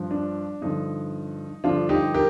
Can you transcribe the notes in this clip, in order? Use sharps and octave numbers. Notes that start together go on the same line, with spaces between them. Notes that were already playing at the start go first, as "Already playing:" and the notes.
Already playing: G2 F3
D4
G2 D3 F3 D#4
G2 D3 F3 D4 F4
D#4 G4
G4 A#4